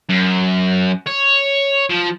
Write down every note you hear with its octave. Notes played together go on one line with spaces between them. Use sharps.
F#2
C#5
F3